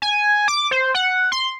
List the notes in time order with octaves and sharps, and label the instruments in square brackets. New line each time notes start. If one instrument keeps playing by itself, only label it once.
[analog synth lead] G#5
D6
C5
F#5
C6